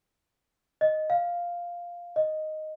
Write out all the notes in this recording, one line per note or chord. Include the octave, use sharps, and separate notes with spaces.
D#5
F5
D#5